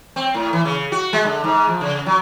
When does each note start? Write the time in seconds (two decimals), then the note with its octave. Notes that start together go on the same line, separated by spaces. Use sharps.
0.16 C4
0.34 A2
0.53 E3
0.65 C#3
0.92 F#4
1.13 G#3
1.26 D3
1.44 G#2
1.68 F3
1.81 C#3
2.06 F#3